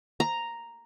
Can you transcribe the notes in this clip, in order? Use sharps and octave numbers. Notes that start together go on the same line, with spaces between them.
A#5